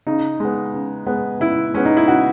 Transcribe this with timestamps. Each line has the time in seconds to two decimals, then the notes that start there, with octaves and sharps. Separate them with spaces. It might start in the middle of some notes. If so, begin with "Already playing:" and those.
0.07 C#3 D#4
0.40 G#3 B3
0.74 C#3
1.06 G#3 B3
1.40 C#3 E4
1.74 G#3 B3 C#4
1.85 D#4
1.97 E4
2.07 C#3 F#4